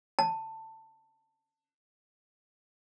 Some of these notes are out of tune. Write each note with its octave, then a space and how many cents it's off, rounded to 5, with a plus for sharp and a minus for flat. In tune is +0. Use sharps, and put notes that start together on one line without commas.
A5 +15